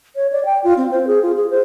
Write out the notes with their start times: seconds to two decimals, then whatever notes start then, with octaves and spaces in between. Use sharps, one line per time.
0.16 C#5
0.32 D5
0.45 G5
0.64 F4
0.77 C4
0.92 C5
1.07 G#4
1.22 F4
1.36 G#4
1.50 C5